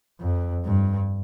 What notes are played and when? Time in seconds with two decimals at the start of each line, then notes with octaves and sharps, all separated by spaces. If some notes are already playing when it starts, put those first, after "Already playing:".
0.20 F2
0.65 G2